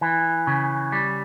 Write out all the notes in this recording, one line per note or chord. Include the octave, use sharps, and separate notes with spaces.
E3
C#3
G3